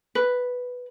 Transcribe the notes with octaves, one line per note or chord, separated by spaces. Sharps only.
B4